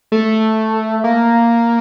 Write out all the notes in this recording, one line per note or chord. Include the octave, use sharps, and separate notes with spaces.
A3
A#3